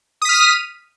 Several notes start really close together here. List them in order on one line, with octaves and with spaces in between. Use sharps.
D#6 B6 F6 D#7